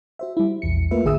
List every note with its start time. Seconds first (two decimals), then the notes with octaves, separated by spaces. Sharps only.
0.19 F#4 C5 E5
0.37 G3 E4
0.62 A#1 E2 C#7
0.91 A3 A#3 F4 A#4 B4 E5
1.05 A1 D3 G#4 E5 D#6 E6